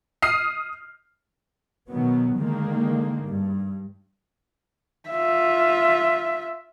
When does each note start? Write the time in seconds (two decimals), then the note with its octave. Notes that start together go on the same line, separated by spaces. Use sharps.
0.22 D#6 F6 C7
1.89 B2 D#3 F#3 B3
2.36 D3 D#3 G#3 A#3
3.23 G2
5.10 F4 E5